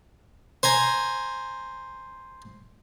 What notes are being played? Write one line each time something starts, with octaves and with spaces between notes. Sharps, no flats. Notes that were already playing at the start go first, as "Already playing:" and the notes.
C5 G#5 A#5